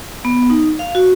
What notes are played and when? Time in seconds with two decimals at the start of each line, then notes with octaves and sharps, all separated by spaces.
0.25 B3
0.50 D#4
0.79 F5
0.95 F#4